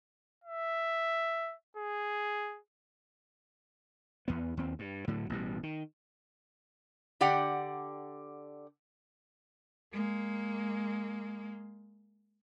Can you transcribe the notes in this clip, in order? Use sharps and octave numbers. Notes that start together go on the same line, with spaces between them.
E5
G#4
E2 B3
D#2 C4
G2
A2 D3 F#3
A1 B2 G3
D#3
D3 G4 D5 F#5 G5
G#3 A#3